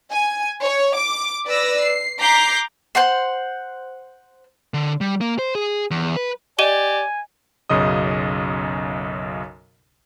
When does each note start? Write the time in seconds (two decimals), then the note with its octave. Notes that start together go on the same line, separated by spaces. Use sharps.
0.11 G#5
0.63 C#5
0.96 D6
1.46 B4 D5 E6 A#6
1.82 C7
2.19 A#5 D6 G6 B6 C7
2.95 C5 F#5 C6
4.74 D3
5.01 G3
5.21 A#3
5.39 C5
5.55 G#4
5.91 E2
6.16 B4
6.59 G4 D5 D#5 G#5 D#7 G7
7.70 B1 F#2 C#3 D#5 D#6